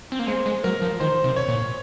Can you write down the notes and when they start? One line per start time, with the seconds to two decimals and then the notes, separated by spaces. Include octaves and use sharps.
0.12 C4
0.19 A#3
0.27 G#3 C5
0.46 G#3
0.64 F#3 A#4
0.82 F3
1.00 D#3 C5
1.24 C3
1.36 C#5
1.48 A#2